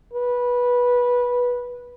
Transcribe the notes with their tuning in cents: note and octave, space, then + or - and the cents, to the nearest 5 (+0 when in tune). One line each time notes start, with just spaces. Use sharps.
B4 -15